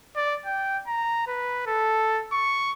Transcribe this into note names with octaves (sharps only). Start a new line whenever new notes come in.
D5
G5
A#5
B4
A4
C#6